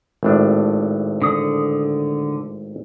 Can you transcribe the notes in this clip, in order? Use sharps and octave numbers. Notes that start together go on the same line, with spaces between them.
G#1 A2 D4
D3 D#6